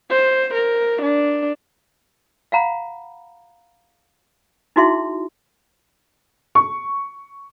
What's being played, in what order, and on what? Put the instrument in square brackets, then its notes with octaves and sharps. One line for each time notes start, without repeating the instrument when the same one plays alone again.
[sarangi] C5
A#4
D4
[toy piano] F5 F#5 A#5 B5
D#4 E4 F#4 G#4 E5 C6
[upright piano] C#6